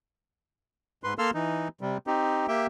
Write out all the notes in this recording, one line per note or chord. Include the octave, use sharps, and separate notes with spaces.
G#2 B4 C6
A#3 A4 F5 C6 E6 F6
E3 D#4
C3 G3
C4 D#4 G4
A#3 G4 E5 G5